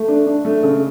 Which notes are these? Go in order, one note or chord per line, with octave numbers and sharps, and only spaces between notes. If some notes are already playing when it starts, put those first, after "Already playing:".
Already playing: A3
D4
D4
A3
C#3